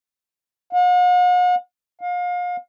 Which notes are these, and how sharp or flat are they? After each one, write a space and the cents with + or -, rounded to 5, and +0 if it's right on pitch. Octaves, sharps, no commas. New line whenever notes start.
F#5 -45
F5 +35